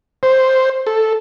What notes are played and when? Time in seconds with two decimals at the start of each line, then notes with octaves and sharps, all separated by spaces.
0.23 C5
0.87 A4